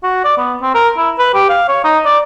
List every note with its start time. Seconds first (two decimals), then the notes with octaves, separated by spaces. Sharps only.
0.03 F#4
0.25 D5
0.38 B3
0.62 C4
0.75 A#4
0.98 E4
1.19 B4
1.35 G4
1.49 F5
1.68 C#5
1.84 D#4
2.05 D5